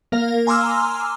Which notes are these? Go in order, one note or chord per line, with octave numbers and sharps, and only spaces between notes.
A#3 A#4 F5
G#5 A#5 C6 D6 E6 F6